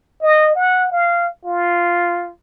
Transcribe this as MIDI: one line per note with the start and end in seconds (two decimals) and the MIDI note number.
0.22 0.52 75
0.55 0.88 78
0.91 1.28 77
1.45 2.30 65